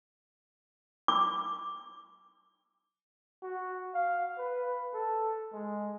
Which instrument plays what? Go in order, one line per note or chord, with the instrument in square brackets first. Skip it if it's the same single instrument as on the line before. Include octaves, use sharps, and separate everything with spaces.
[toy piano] D6
[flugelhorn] F#4
F5
B4
A4
G#3